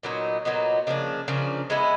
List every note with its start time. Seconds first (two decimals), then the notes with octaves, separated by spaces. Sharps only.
0.03 A#2 F#3 B3 D#4
0.45 A#2 F#3 B3 D#4
0.87 C#3 F3 A#3 D4
1.28 C#3 F3 A#3 D4
1.70 G#3 B3 E4